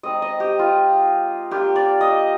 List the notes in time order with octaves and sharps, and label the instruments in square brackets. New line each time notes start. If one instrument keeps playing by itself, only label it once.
[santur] G#3 C4 D#4 D#5
D#5
G4
F4
A#3 D4 F4 G4
D5
D#5